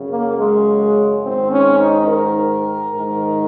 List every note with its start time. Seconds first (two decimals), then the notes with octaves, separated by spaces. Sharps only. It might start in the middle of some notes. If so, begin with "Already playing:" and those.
Already playing: F#2 C#3
0.09 A#3
0.38 G#3
1.23 G#2 D#3 C4
1.51 C#4
1.79 D#4
2.08 A#4
2.93 G#2 D#3